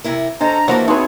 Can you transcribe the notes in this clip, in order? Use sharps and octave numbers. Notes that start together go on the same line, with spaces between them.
C3 E4 A#4
C#4 D4 A4 C5 D#5 A#5
E3 F3 A3 A#3 E4 F#4
B3 C4 D#4 F#4 G#4 B4 C#5 C6